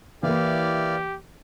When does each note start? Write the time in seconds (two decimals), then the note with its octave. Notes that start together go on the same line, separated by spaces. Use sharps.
0.23 E3 A#3 E4 G4 D5 F5